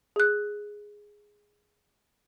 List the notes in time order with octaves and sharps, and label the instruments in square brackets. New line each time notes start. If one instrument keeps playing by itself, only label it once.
[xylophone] G#4 F#6